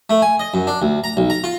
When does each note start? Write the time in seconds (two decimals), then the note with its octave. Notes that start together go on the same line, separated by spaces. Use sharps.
0.10 A3
0.22 G#5
0.40 D#5
0.54 F#2
0.67 D4
0.82 D2
1.04 A#5
1.17 B1
1.30 A#5
1.44 F4